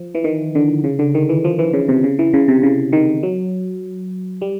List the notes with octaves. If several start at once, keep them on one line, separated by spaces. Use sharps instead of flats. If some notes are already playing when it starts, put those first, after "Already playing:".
Already playing: F3
E3
D#3
D3
C#3
D3
D#3
E3
F3
E3
C#3
C3
C#3
E3
C#3
C3
C#3
D#3
F#3
G3